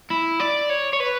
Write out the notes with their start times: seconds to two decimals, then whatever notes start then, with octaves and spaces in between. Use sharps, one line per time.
0.10 E4
0.40 D5
0.69 C#5
0.93 C#5
1.00 B4